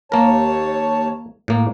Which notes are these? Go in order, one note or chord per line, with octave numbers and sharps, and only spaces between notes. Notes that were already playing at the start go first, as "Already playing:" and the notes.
D#2 A#3 A#4 C#5 A5
A2 A#3